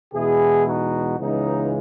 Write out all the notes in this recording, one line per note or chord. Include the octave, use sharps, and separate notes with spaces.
E2 B2 G#3 E4 G#4
D#4 F#4
C#2 C#3 E3 G#3 B3 D#4